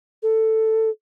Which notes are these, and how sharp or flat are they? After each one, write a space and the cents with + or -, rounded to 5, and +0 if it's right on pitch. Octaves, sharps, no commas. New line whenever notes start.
A4 +10